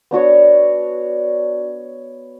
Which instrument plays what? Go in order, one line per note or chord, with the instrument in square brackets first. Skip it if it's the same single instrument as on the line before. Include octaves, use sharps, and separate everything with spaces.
[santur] B3 D4 F#4 C#5